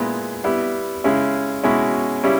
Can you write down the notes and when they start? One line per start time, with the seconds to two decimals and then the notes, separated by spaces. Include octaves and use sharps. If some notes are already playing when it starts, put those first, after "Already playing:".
Already playing: A#2 G#3 B3 E4
0.44 G3 B3 E4
1.04 C#3 G#3 C#4 E4
1.63 B2 G#3 C#4 E4
2.23 C#3 G3 C#4 E4